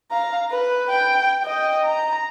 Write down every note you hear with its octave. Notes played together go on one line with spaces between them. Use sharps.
F5 A#5
B4
G5
D#5 G5
A#5